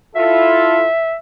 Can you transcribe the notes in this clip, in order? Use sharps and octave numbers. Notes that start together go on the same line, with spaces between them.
E4 F4 A4 E5